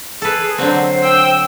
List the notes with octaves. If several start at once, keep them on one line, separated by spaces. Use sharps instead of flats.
G#4 A4 B4
D3 F#3 C4 C5
G5 E6